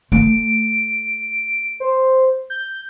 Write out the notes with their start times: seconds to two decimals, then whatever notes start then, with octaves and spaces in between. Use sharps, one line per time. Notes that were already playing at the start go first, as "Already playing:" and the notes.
0.12 A3 D7
1.80 C5
2.50 G6